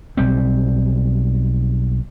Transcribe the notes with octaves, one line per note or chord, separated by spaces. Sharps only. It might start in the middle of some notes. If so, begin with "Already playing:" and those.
B1 G3 C4